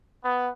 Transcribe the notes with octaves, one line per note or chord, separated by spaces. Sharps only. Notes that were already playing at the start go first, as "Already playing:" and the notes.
B3